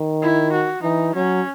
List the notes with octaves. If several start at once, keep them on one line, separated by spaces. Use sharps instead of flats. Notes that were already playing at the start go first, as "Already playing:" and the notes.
Already playing: D#3
E4
F#4
E3 D#4
F#3 C#4